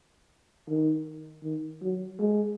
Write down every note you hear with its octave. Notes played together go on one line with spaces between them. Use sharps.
D#3
D#3
F#3
G#3